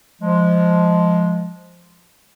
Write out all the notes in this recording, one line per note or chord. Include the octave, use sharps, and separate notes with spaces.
F3 G#3